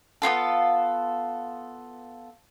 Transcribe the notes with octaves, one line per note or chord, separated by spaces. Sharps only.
B3 C4 F4 A4